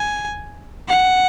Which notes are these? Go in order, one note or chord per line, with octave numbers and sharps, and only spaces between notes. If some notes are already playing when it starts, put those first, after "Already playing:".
Already playing: G#5
F#5